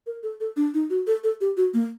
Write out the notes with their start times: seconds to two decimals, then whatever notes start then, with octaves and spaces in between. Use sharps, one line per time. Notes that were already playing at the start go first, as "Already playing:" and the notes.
0.07 A#4
0.23 A4
0.40 A4
0.57 D4
0.74 D#4
0.90 F#4
1.07 A4
1.24 A4
1.41 G4
1.57 F#4
1.74 A#3